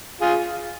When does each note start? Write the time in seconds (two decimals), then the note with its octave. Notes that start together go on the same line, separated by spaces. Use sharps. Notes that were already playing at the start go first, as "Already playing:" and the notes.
0.21 F4 G#4